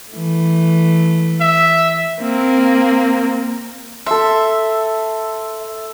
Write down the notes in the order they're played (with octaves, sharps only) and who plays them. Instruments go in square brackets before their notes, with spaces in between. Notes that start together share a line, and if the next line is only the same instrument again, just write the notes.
[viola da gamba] E3 A3
[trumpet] E5
[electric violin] A#3 C4
[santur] A4 C6 [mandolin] E5